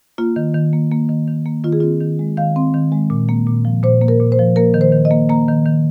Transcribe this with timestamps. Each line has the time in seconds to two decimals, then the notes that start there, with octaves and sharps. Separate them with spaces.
0.18 A#3 F4
0.36 D#3
0.54 D#3
0.73 A#3
0.91 A#3
1.09 D#3
1.28 D#3
1.46 A#3
1.64 D#3 F4
1.73 G#4
1.80 C4 F4
2.01 D#3
2.19 G#3
2.37 D#3 F5
2.56 C4
2.74 D#3
2.92 G#3
3.10 A#2
3.29 A#3
3.47 A#2
3.65 F3
3.83 A#2 C5
4.01 A#3
4.08 A#4
4.20 A#2
4.32 C5
4.39 F3
4.56 A#3 A#4
4.74 D#3
4.81 C5
4.92 D#3
5.05 D#5
5.11 A#3
5.29 A#3 A#5
5.48 D#3
5.66 D#3